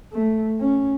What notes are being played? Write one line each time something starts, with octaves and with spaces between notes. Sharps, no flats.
A3
C#4